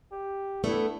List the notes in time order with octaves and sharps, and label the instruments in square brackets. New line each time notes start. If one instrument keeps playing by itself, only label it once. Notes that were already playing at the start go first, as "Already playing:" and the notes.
[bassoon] G4
[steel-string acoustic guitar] A3 B3 [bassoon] D4 [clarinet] E4